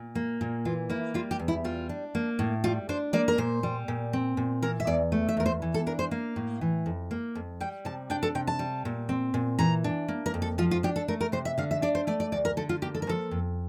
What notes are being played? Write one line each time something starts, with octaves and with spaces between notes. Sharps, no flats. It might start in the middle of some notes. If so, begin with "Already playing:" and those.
Already playing: A#2
A#3
A#2
E3 F4
A#3 E4
G3 F4
G4
E2
E4
G3 F4
D4
A#3
A2
G3 F4
D4 C5
A#3 D5
A#4
A#2 C5
G3
A#2
C4
A#2
E3 A#4
E5
E2 D5
A3
E5
E2 A#4
C5
E3
A4
D4 A#4
C5
A#3 F5
A2
E3
F2
A#3
F2
G3 G5
C3 A5
D4 G5
A4
C3 G5
A5
G3
A#2
C4
A#2
E3 A#5
D4
A#3
A#4
F2
A4
F3 F4
F4
D4 G4
A4
A3 A#4
A#4
C3 C5
E5
D3 F5
E5
D4 D5
C5
A3 D5
D5
D2 D5
A#4
D3 A4
F4
A#3 G4
A4
A#4
F3 A4
F2